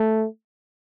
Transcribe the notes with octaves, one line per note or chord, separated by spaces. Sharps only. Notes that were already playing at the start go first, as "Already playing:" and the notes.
Already playing: A3